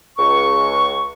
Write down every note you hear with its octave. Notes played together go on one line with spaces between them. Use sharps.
C#2 C#6